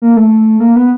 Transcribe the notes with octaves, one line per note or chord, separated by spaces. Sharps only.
A#3
A3
A#3
B3